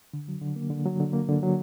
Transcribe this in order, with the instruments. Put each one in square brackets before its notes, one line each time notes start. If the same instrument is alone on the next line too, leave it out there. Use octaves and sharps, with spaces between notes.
[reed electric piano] D3
F#3
D3
A#3
D3
F#3
D3
A#3
D3
F#3